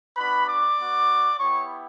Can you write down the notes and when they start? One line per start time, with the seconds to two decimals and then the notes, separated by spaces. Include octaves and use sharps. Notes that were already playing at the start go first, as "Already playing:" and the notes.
0.17 B3 D4 F#4 B4 B5
0.47 D5 D6
0.78 B3 F#4
1.40 B3 E4 G4 C#5 C#6